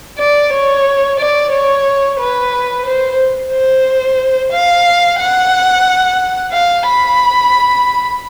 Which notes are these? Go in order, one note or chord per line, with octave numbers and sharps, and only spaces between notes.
D5
C#5
D5
C#5
B4
C5
C5
F5
F#5
F5
B5